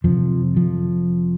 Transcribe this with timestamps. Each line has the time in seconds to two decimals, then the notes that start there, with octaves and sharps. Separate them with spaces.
0.04 F2 C3 F3
0.57 F3